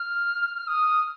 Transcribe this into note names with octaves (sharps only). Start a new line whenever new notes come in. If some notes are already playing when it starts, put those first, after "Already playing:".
Already playing: F6
F6
D#6